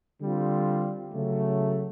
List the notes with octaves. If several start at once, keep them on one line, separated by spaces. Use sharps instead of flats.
D3 G3 C4 F4
C#3 F#3 A3